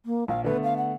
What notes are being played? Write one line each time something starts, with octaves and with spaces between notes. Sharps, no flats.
A#3
A#1 F5
D3 A3 B3 B4
F5
F#5